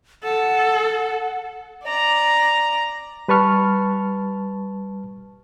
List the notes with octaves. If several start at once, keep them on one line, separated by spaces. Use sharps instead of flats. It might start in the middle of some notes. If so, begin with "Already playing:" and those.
A4 F#5
D5 A#5
G3 B4 A5 C#6 F6